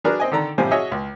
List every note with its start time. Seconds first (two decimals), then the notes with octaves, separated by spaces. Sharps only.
0.04 F#3 D4 G#4 A#4 B4 D5
0.20 C4 D#5 G#5
0.32 D3 D#3 A4 D5 A#5
0.58 A1 C3 F3 G3 C5 G#5
0.71 F#4 G#4 C#5 D#5 E5 G#5
0.92 C#2